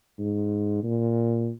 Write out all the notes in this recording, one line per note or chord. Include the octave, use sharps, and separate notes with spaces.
G#2
A#2